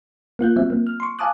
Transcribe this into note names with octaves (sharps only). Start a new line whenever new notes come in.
A#3 F4 F#6 G6
F#3 C4 E5
A#3
F6
C6 C#6
F5 G#5 A5 D6 D#6 F#6